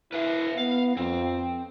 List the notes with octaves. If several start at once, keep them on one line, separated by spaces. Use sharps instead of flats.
E4 B4 E5 F5
B3 F5
F2 C4